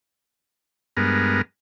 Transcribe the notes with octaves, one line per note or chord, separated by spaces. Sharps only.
G2 G#3 B3 A#4